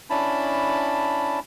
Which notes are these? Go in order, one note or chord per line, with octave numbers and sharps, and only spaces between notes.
C#4 D4 E4 A5 B5